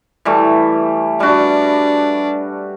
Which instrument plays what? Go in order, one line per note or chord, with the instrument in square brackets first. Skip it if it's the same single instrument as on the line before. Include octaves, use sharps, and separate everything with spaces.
[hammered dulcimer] E3 G3 A3
[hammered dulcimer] G3 F#4 [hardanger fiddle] D4